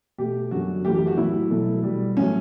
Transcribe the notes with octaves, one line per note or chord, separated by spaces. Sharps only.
B2 A3 G4
F#2 D3 F#3 F#4
F#2 E3 A3 G4
G4
F#4
A2 F#3 A3 E4
B2 F#3 A3
B2 G3
A2 F#3 A3 C#4